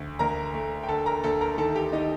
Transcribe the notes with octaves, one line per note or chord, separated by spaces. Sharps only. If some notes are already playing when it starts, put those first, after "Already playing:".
Already playing: D2 A3
D2 A#4 A#5
A3
G5
D3 A4 A5
A#4 A#5
D2 A4 A5
A#4 A#5
D#3 A4 A5
G4 G5
D#3 D#4 D#5